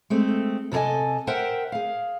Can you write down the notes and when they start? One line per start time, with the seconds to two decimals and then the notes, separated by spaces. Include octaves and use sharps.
0.10 G#3 A3 C4
0.72 C3 A4 A#4 D#5 G#5
1.27 A#4 C5 E5 F#5 G5
1.72 G#4 F5